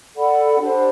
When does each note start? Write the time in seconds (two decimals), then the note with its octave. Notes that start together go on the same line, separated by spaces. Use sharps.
0.15 A4 D5 F#5 B5
0.59 D4 G4 C5